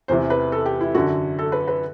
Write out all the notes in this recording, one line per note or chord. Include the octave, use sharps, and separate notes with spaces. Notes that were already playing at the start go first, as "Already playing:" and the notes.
E2 C3 E3 C5
B4
A4
G4
E4
F#2 D3 F#4
A4
B4
B4